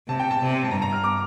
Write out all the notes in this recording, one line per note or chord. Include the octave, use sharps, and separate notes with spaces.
C3 A5
G5
A5
C3
A5
G2 A#5
A#5
F6
D6